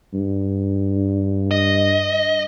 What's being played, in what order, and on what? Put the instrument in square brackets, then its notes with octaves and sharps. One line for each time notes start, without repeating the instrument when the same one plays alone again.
[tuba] G2
[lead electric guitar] D#5